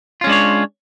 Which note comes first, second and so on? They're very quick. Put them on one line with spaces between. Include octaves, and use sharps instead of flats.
F4 C#4 G#3 D4 C#5